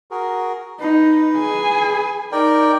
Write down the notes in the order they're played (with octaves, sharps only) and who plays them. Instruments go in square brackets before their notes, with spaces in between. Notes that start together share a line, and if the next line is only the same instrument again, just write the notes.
[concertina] F#4 G#4 A#4
[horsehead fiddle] D#4 [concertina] B4
[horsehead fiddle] G#4 G#5
[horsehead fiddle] D#4 [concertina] A#4 D5 G5